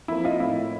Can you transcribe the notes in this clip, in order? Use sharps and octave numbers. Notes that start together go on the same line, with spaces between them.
F3 A#3 E4
D#4 F4
A2 E4